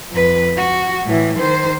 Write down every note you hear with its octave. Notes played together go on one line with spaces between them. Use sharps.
F2 B4
F#4
A2 E3
D#3 C5